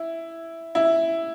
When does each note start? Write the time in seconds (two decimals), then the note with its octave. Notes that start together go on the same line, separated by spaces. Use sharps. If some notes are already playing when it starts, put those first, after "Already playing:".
Already playing: E4
0.75 E4